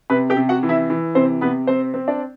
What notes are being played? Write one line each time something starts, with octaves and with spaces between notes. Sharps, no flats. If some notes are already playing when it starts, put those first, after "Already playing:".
C3 B4 B5
G4 G5
C3
F#4 F#5
E3
E4 E5
E3
C3 C4 C5
C3 B3 B4
C4 C5
C4
D4 D5